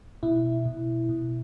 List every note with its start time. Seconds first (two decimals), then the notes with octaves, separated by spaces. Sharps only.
0.23 B2 E4
0.65 B2
1.09 B2